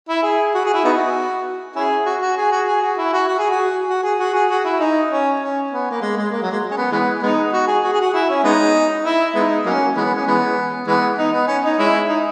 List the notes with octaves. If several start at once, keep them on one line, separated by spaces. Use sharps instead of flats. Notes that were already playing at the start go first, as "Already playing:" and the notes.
E4
G#4
F#4
G#4
E4
B3 D#4 F#4
C#4 E4 G#4
F#4
F#4
G#4
F#4
G#4
F#4
E4
F#4
F#4
G#4
F#4
F#4
G#4
F#4
G#4
F#4
E4
D#4
C#4
C#4
B3
A#3
G#3
G#3
A#3
F#3
G#3
C#4
B3
E3 G#3 B3
G#3 B3 D#4
F#4
G#4
F#4
G#4
F#4
E4
C#4
G#3 B3 D#4
E4
G#3 B3 D#4
F#3 A#3 C#4
E3 G#3 B3
C#4
E3 G#3 B3
E3 G#3 B3
D#4
B3
C#4
D#4
G#3 C#4 E4
D#4